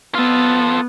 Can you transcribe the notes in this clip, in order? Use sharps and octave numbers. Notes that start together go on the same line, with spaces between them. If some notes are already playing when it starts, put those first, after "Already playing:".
B3 F4 A4